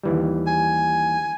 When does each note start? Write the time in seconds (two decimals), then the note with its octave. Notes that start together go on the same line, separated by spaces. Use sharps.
0.03 D#2 E3 G3
0.47 G#5